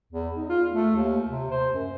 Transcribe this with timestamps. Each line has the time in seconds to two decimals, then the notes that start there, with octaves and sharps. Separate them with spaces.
0.13 E2
0.37 D#4
0.49 F4
0.73 A3
0.96 D#2
1.27 C3
1.51 C5
1.74 F#2